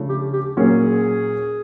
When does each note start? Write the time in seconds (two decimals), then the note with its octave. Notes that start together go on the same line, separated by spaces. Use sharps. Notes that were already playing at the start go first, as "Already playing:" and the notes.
Already playing: C#3 F3 A3 D4
0.09 G4
0.33 G4
0.57 A#2 F#3 A#3 C#4 G#4